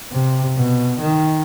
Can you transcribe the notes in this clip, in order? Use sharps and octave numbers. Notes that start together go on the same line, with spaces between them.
C3
B2
D#3